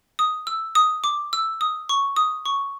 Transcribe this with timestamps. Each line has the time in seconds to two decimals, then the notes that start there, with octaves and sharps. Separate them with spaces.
0.19 D#6
0.47 E6
0.75 D#6
1.04 D6
1.33 E6
1.61 D#6
1.89 C#6
2.16 D#6
2.46 C#6